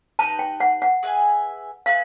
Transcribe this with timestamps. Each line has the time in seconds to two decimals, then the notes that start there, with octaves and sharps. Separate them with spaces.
0.19 D#4 G4 B4 A5
0.39 G5
0.60 F#5
0.82 F#5
1.03 G#4 B4 E5 G#5
1.86 G#4 B4 E5 F5